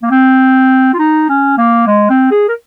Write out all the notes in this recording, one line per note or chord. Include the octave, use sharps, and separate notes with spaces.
A#3
C4
F4
D#4
C#4
A#3
G#3
C4
G#4
A#4